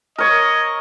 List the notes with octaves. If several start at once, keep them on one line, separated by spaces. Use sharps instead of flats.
A#4 C#5 D#5